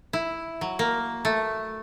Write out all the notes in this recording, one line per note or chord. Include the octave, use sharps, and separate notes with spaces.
E4
F#3
A#3
A3